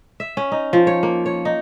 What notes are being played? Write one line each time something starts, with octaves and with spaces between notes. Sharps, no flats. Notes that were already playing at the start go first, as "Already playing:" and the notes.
E5
C#4
D#4
F3
C#5
A#3
C#5
D#4